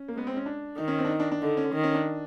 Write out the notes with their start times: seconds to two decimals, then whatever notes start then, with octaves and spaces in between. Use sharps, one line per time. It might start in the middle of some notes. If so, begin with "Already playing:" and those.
Already playing: C#4
0.08 A#3
0.14 G#3 B3
0.27 C4
0.37 C#4
0.46 D4
0.78 D#3 D#4
0.88 C#4
0.98 C4
1.05 D4
1.10 D#4
1.20 D4
1.31 D4
1.42 D3 D#4
1.57 C#4
1.74 D#3
1.84 C#4
1.94 D4